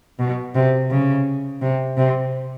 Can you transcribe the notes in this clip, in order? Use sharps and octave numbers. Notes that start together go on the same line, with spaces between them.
B2
C3
C#3
C3
C3